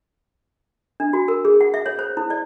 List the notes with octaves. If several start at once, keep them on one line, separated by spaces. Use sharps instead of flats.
D4
F#4
A#4
G#4
F#5
E5
C#5
C5
E4
D5